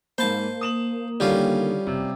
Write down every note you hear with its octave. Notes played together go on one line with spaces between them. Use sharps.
G#2 A#3 C5 A5 B5
D#6 E7 F#7
D3 D#3 G3 C#4 F4
F#1 C3